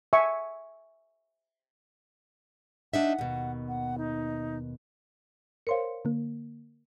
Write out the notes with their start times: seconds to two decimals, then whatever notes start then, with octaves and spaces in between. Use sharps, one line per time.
0.13 E5 G#5 C#6
2.94 D4 D#4 E5 F#5
3.19 D#2 B2
3.68 F#5
3.98 D#4
5.67 A#4 C5 C#5 F5 C6 C#7
6.05 D3 A#3